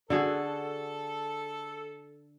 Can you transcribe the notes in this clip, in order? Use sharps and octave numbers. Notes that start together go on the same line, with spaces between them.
D3 F#4 G#4 A4